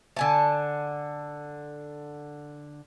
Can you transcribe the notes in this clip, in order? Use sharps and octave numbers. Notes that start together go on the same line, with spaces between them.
D3 G#5 A5